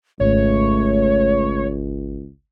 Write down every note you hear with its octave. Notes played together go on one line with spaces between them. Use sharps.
G#1 C#2 A3 C#5